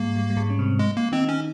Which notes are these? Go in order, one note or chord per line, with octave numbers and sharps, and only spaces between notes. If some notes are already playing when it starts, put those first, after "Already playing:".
Already playing: G#2 G3 G#3 A#3
G3
G3
G#2 G#3
C#4
C3 C4
G#3
A#3
D#3 C4 D#4
C#4